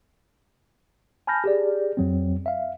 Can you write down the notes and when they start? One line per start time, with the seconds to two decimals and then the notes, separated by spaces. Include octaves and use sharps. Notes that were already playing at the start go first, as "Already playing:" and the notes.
1.27 G#5 A5 B5 F6 G6 A#6
1.44 G4 G#4 D5
1.97 F2 F#3 C4
2.46 E5 F5